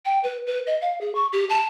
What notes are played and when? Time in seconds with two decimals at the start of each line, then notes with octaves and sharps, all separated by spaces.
0.05 G5
0.24 B4
0.47 B4
0.67 D#5
0.82 F5
1.01 G#4
1.15 C#6
1.33 G4
1.50 A5